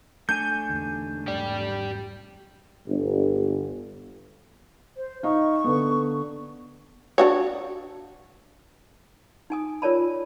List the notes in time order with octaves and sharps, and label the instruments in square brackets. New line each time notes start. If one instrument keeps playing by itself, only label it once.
[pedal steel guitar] A3 D4 G#5 [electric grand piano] G6
[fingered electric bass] E2 D3
[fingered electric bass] E2 G#2 G3 [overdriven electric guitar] G4 D5
[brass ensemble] G1
[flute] C5
[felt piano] D#4 D#5 F5 [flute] C#6
[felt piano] D3 B3
[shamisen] D4 F#4 C#5
[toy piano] D#4 G#5 D#6
F4 A#4 C#5 D5 A5 B5